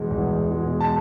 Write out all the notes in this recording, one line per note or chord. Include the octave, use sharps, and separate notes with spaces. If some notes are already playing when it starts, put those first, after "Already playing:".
Already playing: E2 B2 G#3
E2
B2 G#3
A5